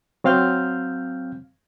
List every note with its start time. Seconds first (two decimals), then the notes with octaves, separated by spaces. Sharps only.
0.24 F#3 C4 F5 F6 G6